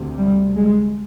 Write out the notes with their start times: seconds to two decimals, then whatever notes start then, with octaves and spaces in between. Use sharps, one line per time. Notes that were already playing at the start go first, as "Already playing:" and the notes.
Already playing: D2 C3
0.18 G3
0.56 G#3